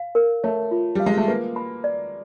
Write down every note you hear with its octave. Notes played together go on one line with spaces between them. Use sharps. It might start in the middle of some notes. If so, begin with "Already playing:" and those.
Already playing: F5
A#4
A3 C#5
F4
G3 F5
G#3
A3
A#3 B4
B5
D5